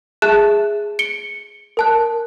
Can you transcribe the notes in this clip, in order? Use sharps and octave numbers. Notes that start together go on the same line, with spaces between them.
G#4 E5 A5 F#6 E7
C#7 D7 G7
A#4 A5 F#6